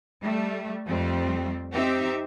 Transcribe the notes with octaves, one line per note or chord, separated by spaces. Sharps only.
G3 A3
F2 G3 A3 C4
C4 D#4 G4 E5